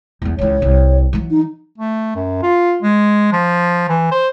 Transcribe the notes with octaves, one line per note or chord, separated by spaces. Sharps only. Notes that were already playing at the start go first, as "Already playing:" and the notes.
E2 F#3
C#2 E3 C#5
C2
E3 F#3
D#4
A3
F#2
F4
G#3
F3
E3
C5